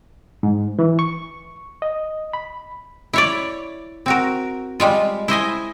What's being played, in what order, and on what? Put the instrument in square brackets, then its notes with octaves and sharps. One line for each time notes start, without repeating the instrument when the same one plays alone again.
[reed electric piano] G#2
E3
C#6
D#5
B5
[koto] E4 C#5 D5
C4 F#4 A#4
G3 G#3 F4
E4 C5 D#5 G#5